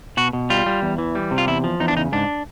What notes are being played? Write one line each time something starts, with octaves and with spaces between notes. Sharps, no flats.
B2 F#4
B2
G3 F4
G3
E2
E3
G3
C3
F4
E2 E4
F3
E2 D#4
D4
C#3 D#4
G#2 D4